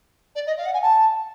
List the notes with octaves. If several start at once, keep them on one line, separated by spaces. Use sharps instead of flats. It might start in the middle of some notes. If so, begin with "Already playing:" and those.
D5
D#5
F5
F#5
G#5
A5